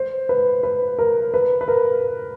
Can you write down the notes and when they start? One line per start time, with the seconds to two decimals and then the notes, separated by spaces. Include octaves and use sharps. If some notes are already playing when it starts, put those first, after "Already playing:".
Already playing: C5
0.29 B4
0.63 B4
0.99 A#4
1.34 B4
1.61 B4
1.68 A#4